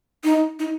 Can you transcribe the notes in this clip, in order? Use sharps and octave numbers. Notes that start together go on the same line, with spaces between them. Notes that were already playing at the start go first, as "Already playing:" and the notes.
D#4
D#4